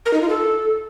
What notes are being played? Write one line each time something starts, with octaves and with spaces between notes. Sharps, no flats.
A#4
D#4
F4
A4